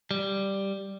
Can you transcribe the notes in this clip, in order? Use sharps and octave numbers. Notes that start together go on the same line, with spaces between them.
G3